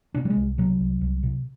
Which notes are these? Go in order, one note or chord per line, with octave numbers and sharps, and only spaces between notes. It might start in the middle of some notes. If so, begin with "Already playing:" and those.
C3 D4
G3
G#3
C2
C3 F#3
C2
C2
C3